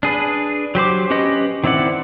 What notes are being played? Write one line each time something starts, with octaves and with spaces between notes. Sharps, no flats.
D4 G#4 B4
F#3 G4 C5 D6
C#4 G4 B4 D#5
D#3 C4 E4 D5 F#5